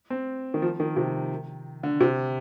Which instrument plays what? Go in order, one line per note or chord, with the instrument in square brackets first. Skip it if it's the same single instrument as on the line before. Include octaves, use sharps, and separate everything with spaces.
[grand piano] C4
D#3
F3
D#3
C3
D3
C3